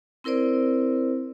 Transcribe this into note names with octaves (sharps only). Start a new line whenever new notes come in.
C4 E4 A#4 C5 D5